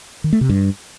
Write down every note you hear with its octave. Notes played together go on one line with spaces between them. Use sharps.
D#3
A3
C3
G2